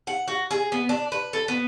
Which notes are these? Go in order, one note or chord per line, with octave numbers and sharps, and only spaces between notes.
F#5
F#4
G#4
B3
D4
B4
A4
B3